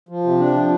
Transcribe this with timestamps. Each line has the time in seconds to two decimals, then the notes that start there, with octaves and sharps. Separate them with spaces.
0.09 F3
0.24 C3
0.39 D4
0.54 F3